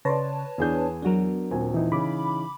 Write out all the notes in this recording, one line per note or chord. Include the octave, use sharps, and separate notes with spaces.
C#3 B4 C#5 D5 A5 C6 A#6
E2 B3 D4 G#4 G6
F#3 B3 D4 F#4 A#4
D#1 C4 G#5
E3 D#4 E4
C#3 B5 D6